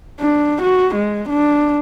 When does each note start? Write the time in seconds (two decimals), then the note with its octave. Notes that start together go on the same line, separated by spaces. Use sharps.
0.20 D4
0.62 F#4
0.96 G#3
1.30 D4